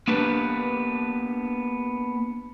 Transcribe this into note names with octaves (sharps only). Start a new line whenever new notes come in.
A#3 B3 D4 G4 B4